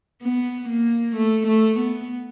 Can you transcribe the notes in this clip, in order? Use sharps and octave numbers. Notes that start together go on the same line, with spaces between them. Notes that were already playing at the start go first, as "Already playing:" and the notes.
B3
A#3
A3
A3
B3